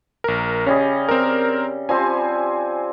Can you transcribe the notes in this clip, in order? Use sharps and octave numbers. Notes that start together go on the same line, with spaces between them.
A#1 A#4
C#3 G3 C#4 D#5
C4 A#4
F3 G3 C4 G#5